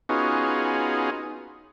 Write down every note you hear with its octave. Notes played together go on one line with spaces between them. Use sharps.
B3 C#4 D#4 F4 F#4 G#4